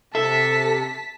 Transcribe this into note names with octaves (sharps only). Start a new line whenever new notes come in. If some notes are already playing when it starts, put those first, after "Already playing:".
C3 A4 E5 A5 B6